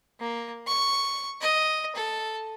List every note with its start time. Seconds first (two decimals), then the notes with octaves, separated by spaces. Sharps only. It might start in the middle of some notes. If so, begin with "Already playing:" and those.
0.20 A#3
0.67 C#6
1.41 D#5
1.96 A4